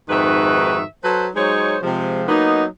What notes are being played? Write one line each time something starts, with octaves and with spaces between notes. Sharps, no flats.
F2 G#2 D#3 F#4 B4 E5
F#3 A4 B4 C5
F#3 G#3 D#4 C5 C#5
C3 F3 G#3
F#3 A#3 B3 D#4